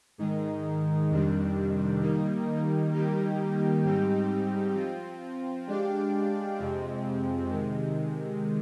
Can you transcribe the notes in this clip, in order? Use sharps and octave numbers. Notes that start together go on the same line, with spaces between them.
G#2 D#3 G#3 D#4
F2 C3 D#3 G3 D4
D#3 G3 A#3 D#4
D#3 G3 A#3 D#4 G4
G#2 G3 C4 D#4 G4
F3 C4 F4
G#3 D4 G4 D5 F5
F2 C3 F3 G#3 C4
C3 D#3 G#3